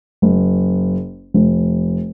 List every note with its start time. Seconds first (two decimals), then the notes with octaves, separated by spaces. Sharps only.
0.22 F#1
1.34 F1